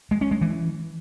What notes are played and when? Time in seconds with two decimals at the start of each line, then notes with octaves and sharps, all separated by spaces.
0.11 G#3
0.21 C#4
0.31 G#3
0.41 E3